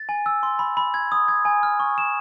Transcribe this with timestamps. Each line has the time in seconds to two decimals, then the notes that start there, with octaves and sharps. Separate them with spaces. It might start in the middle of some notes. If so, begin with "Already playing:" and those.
Already playing: A6
0.09 G#5
0.26 E6
0.43 C6
0.59 B5
0.77 B5
0.94 G#6
1.12 D#6
1.28 G#6
1.45 G#5
1.63 F6
1.80 C#6
1.98 E7